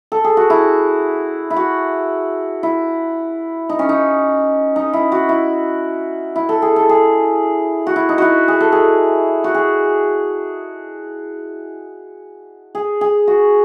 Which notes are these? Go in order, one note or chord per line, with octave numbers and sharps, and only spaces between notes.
A4
G#4
F#4
E4
E4
F#4
E4
D#4
C#4
D#4
D#4
E4
F#4
E4
E4
A4
G#4
A4
G#4
F#4
E4
D#4
E4 F#4
G#4
A4
G#4
F#4
G#4
G#4
G#4
F#4